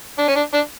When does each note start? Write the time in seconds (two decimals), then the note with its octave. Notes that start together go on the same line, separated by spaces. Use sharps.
0.18 D4
0.28 C#4
0.36 D4
0.54 D4